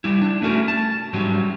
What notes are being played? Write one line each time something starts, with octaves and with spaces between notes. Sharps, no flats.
G3 E4
D4
A3 C#4 F#4 A#4
A5
G#2 F#3 G3 C#4